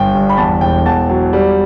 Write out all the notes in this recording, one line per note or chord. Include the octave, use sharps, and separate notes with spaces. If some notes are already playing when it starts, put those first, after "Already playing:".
Already playing: G1 G5
G2
B5
E2 A5
E1 G5
E2 A5
F#3
G3